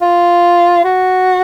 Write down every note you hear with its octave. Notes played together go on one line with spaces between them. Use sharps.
F4
F#4